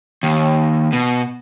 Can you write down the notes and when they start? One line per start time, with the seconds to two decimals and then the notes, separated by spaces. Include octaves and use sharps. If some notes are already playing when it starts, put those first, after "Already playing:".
0.23 D#2
0.93 B2